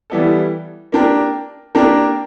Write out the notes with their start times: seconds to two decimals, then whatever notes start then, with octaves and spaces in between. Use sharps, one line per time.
0.10 E3 G3 B3 E4 A4
0.92 A#3 D4 G4 A#4
1.75 A#3 D4 G4 A#4